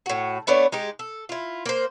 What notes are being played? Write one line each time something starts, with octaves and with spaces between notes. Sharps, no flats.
A2 F#4
A3 B3 D4 C#5
G#3 D#4 G4
A4
E4 F4
A#3 C5